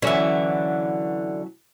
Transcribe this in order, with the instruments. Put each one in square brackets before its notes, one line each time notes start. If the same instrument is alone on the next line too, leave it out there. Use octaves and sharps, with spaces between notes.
[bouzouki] D3 E5 [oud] E3 F#3 C#4